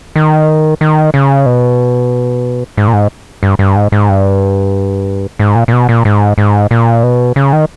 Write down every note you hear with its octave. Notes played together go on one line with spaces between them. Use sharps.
D#3
D#3
C#3
B2
G#2
A#2
G#2
G2
G2
G#2
G#2
G2
G#2
A#2
A#2
B2
A#2
G#2
G#2
A#2
B2
C#3
D#3